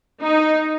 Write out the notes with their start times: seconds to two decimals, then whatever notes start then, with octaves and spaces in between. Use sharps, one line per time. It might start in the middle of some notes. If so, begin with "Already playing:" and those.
0.21 D#4